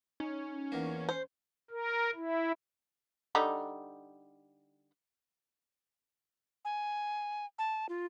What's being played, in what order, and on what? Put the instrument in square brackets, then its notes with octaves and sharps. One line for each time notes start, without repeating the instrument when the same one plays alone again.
[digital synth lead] C#4 [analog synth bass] D#4
[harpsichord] E2 A#3
[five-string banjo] C5
[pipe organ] A#4
E4
[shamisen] D3 G3 D#4
[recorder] G#5
A5
F4